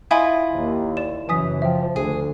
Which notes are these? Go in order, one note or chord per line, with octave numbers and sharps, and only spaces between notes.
E4 F4 D#5 F#5 G#5
D#2
D5 E7
F#2 C#3 E3 G#5 D#6 B6
F3 E5 G5
D2 G#4